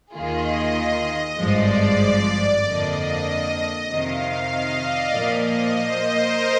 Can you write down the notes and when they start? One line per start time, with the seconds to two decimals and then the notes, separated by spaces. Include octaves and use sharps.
0.12 D#2 D#3 A#3 F4 G#4 D#5
1.38 G#1 G2 F3 G#3 D5
2.63 F2 D3 F3 A#3 D4 D#5
3.89 F2 C3 D#3 F5
4.52 D#5
4.82 D5
5.15 A#2 F3 A#3 D5
5.45 D#5
5.76 C5
6.09 A#4